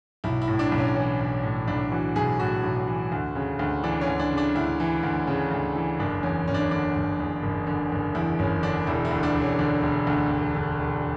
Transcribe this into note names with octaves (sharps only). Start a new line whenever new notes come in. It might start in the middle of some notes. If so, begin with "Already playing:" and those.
B1 E4
E4
A2
D4
B1
C#4
E3 C#4
B1
A2
B1 D4
E3 F#4
B1 G#4
A2 F#4
B1
E3
D2
C#3
D2
E3 D4
C#4
D2
D4
C#3
D4
D2 E4
E3
D2
C#3
D2
E3
F#1 D4
E2 C#4
F#1 C#4
D4
C#4
D3 D4
F#1
E2
F#1
D3
F#1
E2 E4
F#1 C#4
D3 D4
E1 E4
E4
D2
D4
E1
C#4
D3 D4
E1
D2
E1
D3
E1